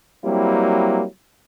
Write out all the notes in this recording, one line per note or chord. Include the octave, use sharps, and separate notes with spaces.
F#3 G3 A#3 C4 E4